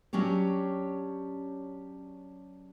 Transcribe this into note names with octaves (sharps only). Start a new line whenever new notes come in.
F#3 C#4 D4 G4 C#5